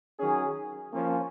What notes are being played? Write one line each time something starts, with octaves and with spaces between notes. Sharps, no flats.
D#3 F#3 C#4 G#4
F3 A#3 C#4